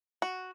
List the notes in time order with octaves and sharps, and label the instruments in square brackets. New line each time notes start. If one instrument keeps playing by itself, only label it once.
[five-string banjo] F#4